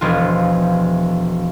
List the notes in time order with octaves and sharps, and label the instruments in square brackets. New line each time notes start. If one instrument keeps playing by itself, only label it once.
[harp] E1 F3 F4